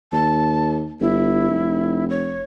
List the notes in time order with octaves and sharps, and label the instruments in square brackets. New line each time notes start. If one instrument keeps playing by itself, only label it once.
[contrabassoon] D#2 [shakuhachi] A5
[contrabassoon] G1 [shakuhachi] E4
[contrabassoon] F1
[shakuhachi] C#5